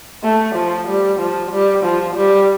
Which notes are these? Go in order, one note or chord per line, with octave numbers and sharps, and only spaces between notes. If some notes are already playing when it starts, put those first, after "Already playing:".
A3
F3
G3
F3
G3
F3
G3